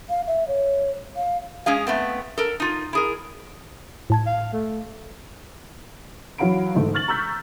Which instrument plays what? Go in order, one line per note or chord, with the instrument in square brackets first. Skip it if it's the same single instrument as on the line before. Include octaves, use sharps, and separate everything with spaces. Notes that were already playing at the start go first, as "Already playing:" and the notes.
[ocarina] F5
E5
C#5
F5
[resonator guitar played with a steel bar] G#3 C#4 G#4 F5
A3 B3 C4
A4 A#4
D#4 F4
E4 G#4 A#4
[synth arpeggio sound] A2 A5 G#6
[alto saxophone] F5
A3
[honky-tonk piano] E3 F#3 F5 F#5 B5 D7
G#2 D3 E3 A3 D#4
C#6 F6 A6 F#7
A#5 C#6 E6 G6 B6